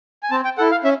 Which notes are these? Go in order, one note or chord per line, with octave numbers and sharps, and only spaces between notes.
G#5
C4 A5
G5
E4 A4 F#5
F5
C#4 E5